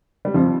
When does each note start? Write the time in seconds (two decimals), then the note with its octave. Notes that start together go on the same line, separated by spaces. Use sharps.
0.25 G3
0.34 F2 F3